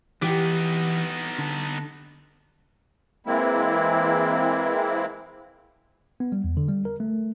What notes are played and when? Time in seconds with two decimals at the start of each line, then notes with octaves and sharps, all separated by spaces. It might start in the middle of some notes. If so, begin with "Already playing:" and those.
0.22 E3 B3 D#4 G4
1.39 D3
3.27 E3 G#3 A#3 C4 E4
6.20 B3
6.32 G3
6.44 E2
6.57 D3
6.69 G3
6.85 A#4
7.00 A3